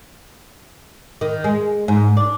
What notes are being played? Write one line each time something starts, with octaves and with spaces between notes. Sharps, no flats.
D#3
G#3
G#2
D4